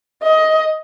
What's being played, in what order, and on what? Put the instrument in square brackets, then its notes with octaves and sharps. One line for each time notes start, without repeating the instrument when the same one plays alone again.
[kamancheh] D#5